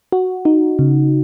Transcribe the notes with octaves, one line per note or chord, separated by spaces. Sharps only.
F#4
D#4
C#3